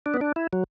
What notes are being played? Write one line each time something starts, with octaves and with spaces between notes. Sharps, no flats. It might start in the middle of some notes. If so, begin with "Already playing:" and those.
D4
B3
D4
E4
F#3